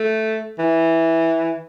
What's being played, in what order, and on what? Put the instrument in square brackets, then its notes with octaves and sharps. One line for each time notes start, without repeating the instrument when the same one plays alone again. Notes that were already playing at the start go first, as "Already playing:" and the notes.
Already playing: [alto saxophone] A3
E3